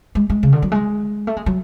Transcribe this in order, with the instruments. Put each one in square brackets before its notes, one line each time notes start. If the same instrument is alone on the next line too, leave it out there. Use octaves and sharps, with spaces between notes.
[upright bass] G#3
G#3
C#3
D3
F#3
G#3
A3
G#3
F#3